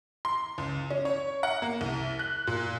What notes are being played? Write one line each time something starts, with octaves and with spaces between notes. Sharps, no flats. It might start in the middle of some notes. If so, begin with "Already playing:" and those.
C6
C#2
C#4
C#5
F#5
A#3
C2
F#6
A#2